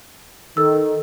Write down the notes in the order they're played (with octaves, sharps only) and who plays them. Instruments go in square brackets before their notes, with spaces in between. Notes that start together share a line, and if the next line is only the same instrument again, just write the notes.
[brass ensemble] D#3 [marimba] A4 E6